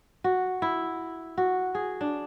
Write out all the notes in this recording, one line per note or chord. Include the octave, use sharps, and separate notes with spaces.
F#4
E4
F#4
G#4
D4